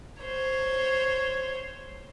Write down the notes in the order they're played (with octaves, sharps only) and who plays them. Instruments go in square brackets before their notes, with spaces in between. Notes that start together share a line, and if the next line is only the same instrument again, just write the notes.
[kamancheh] C5 C#5